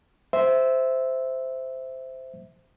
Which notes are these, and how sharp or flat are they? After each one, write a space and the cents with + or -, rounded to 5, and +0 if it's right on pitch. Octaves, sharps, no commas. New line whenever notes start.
C5 -5 E5 -5